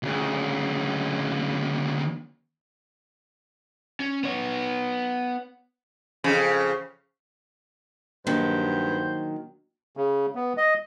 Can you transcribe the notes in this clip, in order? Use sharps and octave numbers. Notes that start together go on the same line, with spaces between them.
D2 C#3
C#4
B3 C#5
F2 C#3
G2 D#3 F#3 A#3 D4 F#4 C5
C#3
B3
D#5